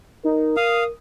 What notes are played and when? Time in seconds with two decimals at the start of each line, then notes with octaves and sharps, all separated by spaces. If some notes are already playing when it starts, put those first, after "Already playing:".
0.24 D#4 A#4
0.57 F5 D#6